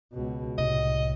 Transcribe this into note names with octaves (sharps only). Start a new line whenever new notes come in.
C#2 B2
C2 A2 D#5